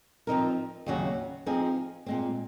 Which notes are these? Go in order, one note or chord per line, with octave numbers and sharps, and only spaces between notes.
F3 C4 D#4 A#4
D#2 C#3 F#3 C#4 F#4
F3 C4 D#4 G#4
A#2 G#3 C4